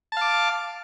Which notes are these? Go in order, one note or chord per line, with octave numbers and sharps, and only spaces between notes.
F5 A5 D6